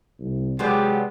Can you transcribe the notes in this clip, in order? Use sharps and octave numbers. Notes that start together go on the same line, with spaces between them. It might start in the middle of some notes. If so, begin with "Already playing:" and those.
C2
C3 F#3 G#3 B3 G4 G#4 D5